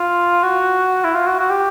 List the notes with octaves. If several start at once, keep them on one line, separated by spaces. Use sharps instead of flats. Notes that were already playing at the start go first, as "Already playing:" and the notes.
Already playing: F4
F#4
E4
F4
F#4
F#4
G4